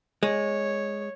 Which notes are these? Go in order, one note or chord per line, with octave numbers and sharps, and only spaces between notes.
G#3 C#5